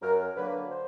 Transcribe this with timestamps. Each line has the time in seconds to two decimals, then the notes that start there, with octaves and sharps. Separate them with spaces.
0.02 F#2 A#4
0.36 D3 F#3 A#3 B4
0.70 C5